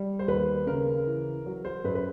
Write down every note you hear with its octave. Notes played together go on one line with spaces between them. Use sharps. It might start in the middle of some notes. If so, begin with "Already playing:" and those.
Already playing: G3
C5
D#2 B4
C#3 A#4
E3
F#3
C5
F#2 B4
B4